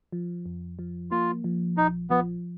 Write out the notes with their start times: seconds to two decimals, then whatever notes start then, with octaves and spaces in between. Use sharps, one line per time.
0.12 F3
0.46 F2
0.79 F3
1.11 A#3 F4
1.44 F3
1.77 A#1 D#4
2.10 F3 B3